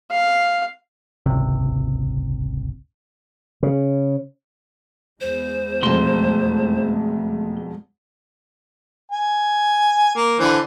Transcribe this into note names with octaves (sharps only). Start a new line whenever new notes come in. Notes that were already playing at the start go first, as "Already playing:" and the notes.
F5
D#1 G#1 C#2 C3
C#3
E2 G#3 C5
E1 F2 A3 C6
G#5
A#3
D3 E3 C5